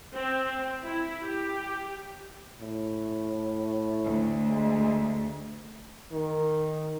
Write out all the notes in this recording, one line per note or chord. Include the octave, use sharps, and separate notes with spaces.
C4
E4
G4
A2
D2
G#3
D#3